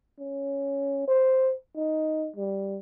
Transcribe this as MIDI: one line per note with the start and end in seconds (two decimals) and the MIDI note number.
0.19 1.04 61
1.08 1.53 72
1.76 2.30 63
2.36 2.80 55